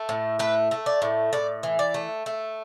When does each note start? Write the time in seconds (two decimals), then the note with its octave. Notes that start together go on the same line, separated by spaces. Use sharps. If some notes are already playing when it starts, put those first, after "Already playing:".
Already playing: A3
0.09 A2
0.39 A3 B4
0.71 A3
0.86 D5
1.02 A2
1.33 A2 D5
1.63 E3
1.79 D5
1.94 A3
2.26 A3